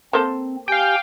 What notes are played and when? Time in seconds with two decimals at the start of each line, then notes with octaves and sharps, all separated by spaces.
0.13 A#3 C4 A4 C5
0.68 G4 F5 G5 G#5